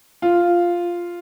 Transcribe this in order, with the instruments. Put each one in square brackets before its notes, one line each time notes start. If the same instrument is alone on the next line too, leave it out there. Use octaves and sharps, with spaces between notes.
[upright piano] F4